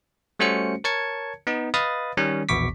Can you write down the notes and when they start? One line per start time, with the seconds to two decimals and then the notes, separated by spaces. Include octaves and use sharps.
0.39 G3 A3 C#4 F#4 C5 C#7
0.84 A#4 C#5 A5 G#6 C#7
1.47 B3 D#4
1.74 B4 D#5 F5 B5 D#6 A6
2.17 D#3 G3 C#4
2.49 A#1 E2 B2 C#6 D6 B6